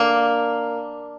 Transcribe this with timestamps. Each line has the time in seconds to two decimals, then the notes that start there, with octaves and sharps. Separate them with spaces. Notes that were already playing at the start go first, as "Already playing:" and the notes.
Already playing: A#3 D4